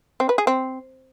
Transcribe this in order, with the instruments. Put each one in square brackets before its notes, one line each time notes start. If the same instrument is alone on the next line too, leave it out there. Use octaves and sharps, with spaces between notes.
[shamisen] C4
B4
G#4
C4